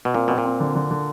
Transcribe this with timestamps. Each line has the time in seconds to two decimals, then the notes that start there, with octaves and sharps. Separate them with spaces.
0.05 B2
0.14 A#2 C4
0.28 B2 C4
0.38 A#2
0.45 C4
0.60 D3
0.75 D3
0.91 D3